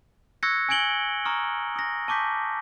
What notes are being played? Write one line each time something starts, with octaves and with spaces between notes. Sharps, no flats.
C#6 E6 F#6 G#6 A#6 C#7
G#5 E6 G#6 D7 F#7 G7
A#5 C#6 D#6 F6
D#6 A#6
A5 C#6 D6 G6 B6